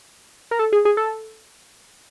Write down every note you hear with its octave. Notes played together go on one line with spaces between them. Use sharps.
A#4
A4
G#4
G#4
A4